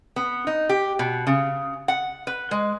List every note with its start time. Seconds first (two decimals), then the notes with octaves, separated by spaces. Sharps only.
0.16 B3
0.47 D#4
0.69 G4
0.99 B2
1.27 C#3
1.88 F#5
2.27 B4
2.51 G#3